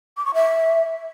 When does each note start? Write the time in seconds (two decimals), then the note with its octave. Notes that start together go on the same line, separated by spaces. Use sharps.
0.17 D6
0.26 C#6
0.34 E5